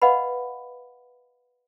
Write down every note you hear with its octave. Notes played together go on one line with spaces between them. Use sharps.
B4 D#5 F5 F#5 B5